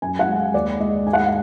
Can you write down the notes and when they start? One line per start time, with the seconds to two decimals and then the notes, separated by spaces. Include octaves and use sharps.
0.02 F#2 G#5
0.19 F#5
0.28 G#3
0.36 F5
0.54 D#2 D5
0.80 G#3 D#5
1.06 G#2 G#5
1.13 F#5
1.21 F5
1.27 F#5